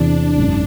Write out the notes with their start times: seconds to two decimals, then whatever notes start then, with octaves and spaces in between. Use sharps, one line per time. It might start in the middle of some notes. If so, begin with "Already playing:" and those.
Already playing: E2 C3 E3 D4
0.37 G#1 F#2 D#3